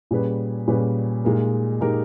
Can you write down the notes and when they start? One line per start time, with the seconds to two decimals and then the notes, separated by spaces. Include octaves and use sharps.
0.11 A#2 G3 C#4 G#4 B4
0.68 A#2 G3 C#4 G#4 B4
1.25 A#2 G#3 D#4 G4 A#4
1.81 A#2 G#3 D#4 G4 A#4